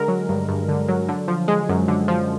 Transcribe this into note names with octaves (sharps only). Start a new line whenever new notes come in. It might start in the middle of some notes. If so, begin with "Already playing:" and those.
Already playing: D3 G#3 A#4
F#3
G2
G2
D3
F#3
D3
F3
G#3
F#2
D3
F3